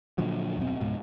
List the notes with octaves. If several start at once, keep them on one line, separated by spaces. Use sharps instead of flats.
A#2 D3 F3 F#3
D#1 F#2 B2 C4
C#2 G#2 B2